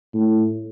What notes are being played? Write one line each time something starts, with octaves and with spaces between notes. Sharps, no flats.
A2